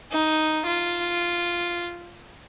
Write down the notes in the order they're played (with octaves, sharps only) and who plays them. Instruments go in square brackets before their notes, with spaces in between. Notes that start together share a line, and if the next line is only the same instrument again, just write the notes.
[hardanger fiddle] D#4
F4